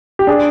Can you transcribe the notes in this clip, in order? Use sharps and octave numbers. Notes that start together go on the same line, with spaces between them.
G4
D4 G#4